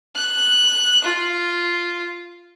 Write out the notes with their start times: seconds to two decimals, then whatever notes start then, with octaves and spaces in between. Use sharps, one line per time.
0.16 F#6
1.04 F4